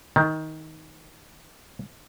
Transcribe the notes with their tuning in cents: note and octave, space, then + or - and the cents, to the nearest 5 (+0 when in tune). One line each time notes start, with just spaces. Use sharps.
D#3 +15